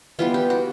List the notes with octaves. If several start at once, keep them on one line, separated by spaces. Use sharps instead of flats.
E3 G3 B3 F4
G4
F#4